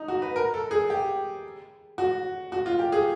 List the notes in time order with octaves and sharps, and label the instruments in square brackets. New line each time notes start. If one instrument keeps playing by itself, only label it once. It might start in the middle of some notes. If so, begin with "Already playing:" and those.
Already playing: [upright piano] D#4
F#4
B4
A#4
A4
G#4
G4
F#4
F#4
F4
G4
G#4